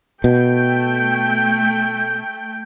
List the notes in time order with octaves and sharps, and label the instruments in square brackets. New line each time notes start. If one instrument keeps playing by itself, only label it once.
[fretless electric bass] B2 [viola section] A3 G5